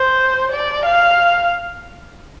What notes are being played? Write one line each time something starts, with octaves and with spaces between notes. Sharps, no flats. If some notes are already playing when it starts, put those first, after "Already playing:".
Already playing: C5
D5
F5